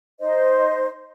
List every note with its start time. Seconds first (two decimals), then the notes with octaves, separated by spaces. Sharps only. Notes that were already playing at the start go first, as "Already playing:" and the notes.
0.21 D#4 C5 D#5